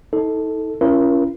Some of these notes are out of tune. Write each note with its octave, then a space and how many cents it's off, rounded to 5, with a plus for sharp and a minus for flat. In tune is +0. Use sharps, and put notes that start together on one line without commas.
D#4 +35 A4 +0
C#4 +0 E4 +45 A#4 +30